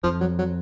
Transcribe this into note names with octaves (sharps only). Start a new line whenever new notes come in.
F2 F3
F#3
F#3